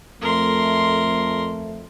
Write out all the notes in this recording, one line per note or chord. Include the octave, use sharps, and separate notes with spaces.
F2 A3 A#4 C6